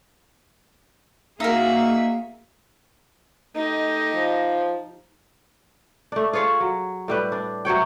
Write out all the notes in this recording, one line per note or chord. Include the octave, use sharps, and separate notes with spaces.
A#3 D#4 F#4 G#4 A#4 E5 F5
A3 D#4 G4 D#5
F3
A3 D4
F4 G#4 C#5 F5
F#3
A2 G3 B4
D4
C3 F#3 C#5 G5